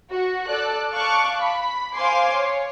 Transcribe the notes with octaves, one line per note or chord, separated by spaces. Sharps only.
F#4
A4 D5 F#6
F5 A5 C#6 D6 F#6
B5
C5 F5 G#5 C6 D6 C7
C#5